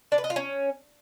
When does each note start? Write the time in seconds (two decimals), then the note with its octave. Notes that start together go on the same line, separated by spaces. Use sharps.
0.12 D4
0.18 B4
0.24 D#5
0.30 F4
0.36 C#4